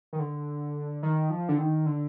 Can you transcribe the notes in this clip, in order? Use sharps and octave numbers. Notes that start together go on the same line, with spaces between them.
D#3
D3
D#3
F3
D3
D#3
D3